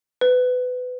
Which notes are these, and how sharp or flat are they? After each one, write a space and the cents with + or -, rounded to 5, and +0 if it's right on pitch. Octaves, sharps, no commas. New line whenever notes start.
B4 +25